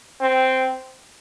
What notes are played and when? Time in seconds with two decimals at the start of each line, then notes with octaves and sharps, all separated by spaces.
0.21 C4